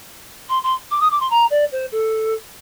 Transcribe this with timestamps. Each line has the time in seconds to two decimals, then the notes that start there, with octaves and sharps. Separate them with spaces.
0.49 C6
0.63 C6
0.91 D6
1.01 D#6
1.11 D6
1.20 C6
1.30 A#5
1.50 D5
1.72 C5
1.92 A4